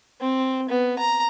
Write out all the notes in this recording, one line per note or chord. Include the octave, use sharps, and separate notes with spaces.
C4
B3
A#5